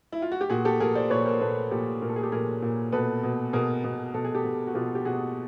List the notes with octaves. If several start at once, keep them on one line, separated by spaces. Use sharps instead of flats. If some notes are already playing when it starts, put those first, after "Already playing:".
E4
F4
F#4
G4
A#2 F#4 G#4
G4 A4
A#2 G#4 A#4
C5 D5
A#2 B4 C#5
A#4 C5
A#2 A4 B4
A#2 G4 A4
A#2 A#4
A4
G#4
G4 A4
A#2 G#4 A#4
A#2
B2 A4 B4
B2
B2 G#4 A#4
B2
B2 A4
G#4
G4 A4
B2
F#4
B2 F4 G4
G4
B2 F#4 G#4